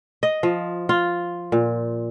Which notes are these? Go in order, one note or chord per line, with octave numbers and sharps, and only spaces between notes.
D#5
F3
F4
A#2